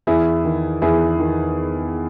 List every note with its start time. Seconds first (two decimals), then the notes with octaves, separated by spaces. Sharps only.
0.07 E2 E4 G#4
0.45 D#3
0.82 E2 E4 G#4
1.19 D#3